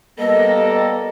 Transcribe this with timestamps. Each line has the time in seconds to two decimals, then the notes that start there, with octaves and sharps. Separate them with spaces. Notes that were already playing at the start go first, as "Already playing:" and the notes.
0.19 G3 A#3 B3 G4 A4 D#5